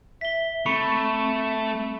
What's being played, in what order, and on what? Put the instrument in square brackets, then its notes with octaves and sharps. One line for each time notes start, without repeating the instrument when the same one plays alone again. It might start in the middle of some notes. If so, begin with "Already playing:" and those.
[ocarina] E5 [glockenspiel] B6 G7
[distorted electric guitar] A3 [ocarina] C4 [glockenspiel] B5 C#6 C#7